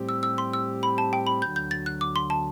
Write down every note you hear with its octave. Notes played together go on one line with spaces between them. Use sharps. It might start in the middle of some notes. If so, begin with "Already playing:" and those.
Already playing: A2 G3 C4 G4
E6
E6
C6
E6
B5
A5
G5
B5
D2 D3 F#3 G6
G6
A6
F#6
D6
C6
A5